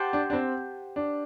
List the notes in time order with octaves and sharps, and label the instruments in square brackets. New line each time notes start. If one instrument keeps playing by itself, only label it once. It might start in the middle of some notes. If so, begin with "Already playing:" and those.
Already playing: [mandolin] G4 C5 F#5 A5
[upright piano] D4
D4
C4
D4